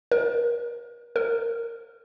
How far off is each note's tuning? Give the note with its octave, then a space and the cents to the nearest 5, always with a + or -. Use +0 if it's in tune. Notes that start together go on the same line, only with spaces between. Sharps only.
A#4 +40
A#4 -10